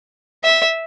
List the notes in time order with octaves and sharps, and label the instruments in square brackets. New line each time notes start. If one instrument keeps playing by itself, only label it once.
[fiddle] E5